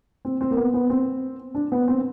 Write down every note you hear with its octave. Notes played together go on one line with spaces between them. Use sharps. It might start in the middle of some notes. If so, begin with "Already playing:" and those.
C4
C4
A#3
B3
B3
C4
D4
B3
C4